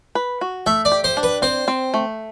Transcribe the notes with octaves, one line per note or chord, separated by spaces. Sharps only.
B4
F#4
A3 E5
D5
G4
C5
D4
B4
C4 C5
C4
A3